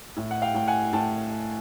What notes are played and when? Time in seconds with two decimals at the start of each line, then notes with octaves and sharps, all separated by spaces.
0.17 A2
0.31 F#5
0.42 F5 G5
0.54 A2 G5
0.68 F#5 G#5
0.93 A2 G5 A5